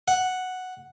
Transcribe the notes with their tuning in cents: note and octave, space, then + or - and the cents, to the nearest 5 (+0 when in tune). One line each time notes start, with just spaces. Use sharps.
F#5 +0